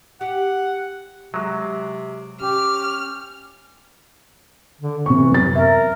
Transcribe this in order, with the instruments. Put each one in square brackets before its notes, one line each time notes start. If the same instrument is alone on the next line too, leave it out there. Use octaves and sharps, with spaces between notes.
[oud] G4 [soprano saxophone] F#5
[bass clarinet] C3 [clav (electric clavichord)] F#3 G#3
[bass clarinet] C#4 [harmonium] G4 [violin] F6
[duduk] D3
[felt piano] C3 C#6 [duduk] E3
[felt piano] F#2 A6
[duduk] A#4 [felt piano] E5